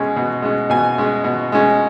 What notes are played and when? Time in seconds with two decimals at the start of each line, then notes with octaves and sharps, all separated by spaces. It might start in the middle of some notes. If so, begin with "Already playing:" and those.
Already playing: B2 G#3 C#4
0.16 B2
0.42 G#3 C#4
0.70 B2 G#5
0.98 G#3 C#4
1.24 B2
1.52 G#3 C#4